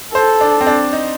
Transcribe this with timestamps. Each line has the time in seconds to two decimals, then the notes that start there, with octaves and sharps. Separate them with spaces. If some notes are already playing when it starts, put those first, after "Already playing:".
0.14 A4 C5
0.41 D4
0.61 C4
0.67 D4
0.93 D#4